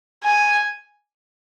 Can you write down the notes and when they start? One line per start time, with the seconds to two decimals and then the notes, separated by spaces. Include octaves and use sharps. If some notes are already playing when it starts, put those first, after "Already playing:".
0.24 G#5